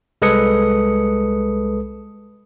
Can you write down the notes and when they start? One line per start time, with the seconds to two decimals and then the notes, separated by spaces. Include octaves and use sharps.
0.22 C2 G#3 A4 B4 D#6 C#7